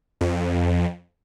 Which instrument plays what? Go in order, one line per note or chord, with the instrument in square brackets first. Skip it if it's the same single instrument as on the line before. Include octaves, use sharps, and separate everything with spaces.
[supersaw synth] F2